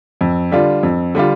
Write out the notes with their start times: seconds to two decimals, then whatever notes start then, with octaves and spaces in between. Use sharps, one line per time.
0.21 F2
0.52 D3 G3 D4 F4
0.83 F2
1.15 D3 G3 D4 F4